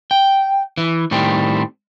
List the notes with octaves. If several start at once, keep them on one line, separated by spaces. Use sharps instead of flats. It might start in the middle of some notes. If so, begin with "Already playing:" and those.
G5
E3
A2 D#3 G3 C4